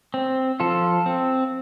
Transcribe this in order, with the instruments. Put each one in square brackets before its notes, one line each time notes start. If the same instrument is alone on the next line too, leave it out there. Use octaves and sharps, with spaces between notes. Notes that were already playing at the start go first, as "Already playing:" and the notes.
[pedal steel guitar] C4
F3 F4 A4
C4